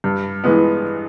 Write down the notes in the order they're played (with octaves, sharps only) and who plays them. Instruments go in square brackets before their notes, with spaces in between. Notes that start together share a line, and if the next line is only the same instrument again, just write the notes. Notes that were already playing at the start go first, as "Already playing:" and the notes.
[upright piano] G2
E3 G#3 B3